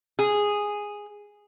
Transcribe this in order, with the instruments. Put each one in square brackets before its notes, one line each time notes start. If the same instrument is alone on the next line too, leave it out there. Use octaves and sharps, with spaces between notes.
[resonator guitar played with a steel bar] G#4